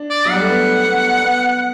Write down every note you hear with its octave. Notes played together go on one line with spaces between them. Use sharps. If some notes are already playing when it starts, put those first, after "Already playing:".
Already playing: D4
D5
F#3
G3 F#5
A3
B3
B3
B3